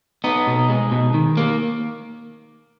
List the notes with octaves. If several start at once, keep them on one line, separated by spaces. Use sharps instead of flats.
B3 D#4
B2
G#3
B2
D#3
A#3